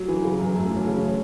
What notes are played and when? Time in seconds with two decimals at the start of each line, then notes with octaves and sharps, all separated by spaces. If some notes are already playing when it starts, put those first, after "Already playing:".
Already playing: F#3
0.08 E3
0.24 C#3
0.40 F#2
0.55 F#2 A3
0.71 E3
0.76 C#4
0.87 C#3
0.96 C#4